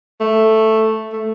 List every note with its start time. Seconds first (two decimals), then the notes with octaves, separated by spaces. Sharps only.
0.20 A3
1.13 A3